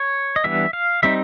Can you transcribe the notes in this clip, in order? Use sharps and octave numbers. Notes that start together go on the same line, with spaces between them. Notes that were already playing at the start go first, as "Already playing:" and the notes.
Already playing: C#5
D#5
E3 G3 B3 D4 E5
F5
G3 C4 D#4 E5